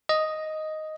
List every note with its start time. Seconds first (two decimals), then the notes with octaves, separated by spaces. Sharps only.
0.09 D#5